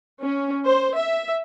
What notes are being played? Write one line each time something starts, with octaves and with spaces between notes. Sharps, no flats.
C#4
C5
E5